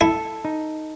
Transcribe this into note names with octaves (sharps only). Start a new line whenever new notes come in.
E4 A4
D#4